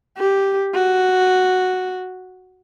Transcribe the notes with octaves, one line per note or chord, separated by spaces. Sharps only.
G4
F#4